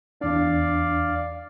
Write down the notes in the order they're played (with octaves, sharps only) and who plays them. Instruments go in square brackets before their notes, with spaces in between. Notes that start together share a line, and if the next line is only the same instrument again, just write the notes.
[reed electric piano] E2 D4 [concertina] D5 F5